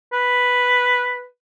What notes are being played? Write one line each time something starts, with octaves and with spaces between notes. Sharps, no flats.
B4